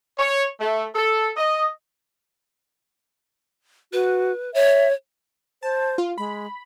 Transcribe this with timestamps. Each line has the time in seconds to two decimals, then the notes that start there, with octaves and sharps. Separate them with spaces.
0.19 C#5
0.60 A3
0.95 A4
1.37 D#5
3.93 F#4 B4
4.54 C#5 E5
5.63 C5 A5
5.98 F4
6.18 G#3 B5